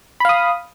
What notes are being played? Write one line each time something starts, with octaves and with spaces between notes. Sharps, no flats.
F5 B5 D#6